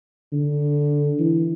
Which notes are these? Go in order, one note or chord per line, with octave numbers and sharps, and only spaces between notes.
D3
E3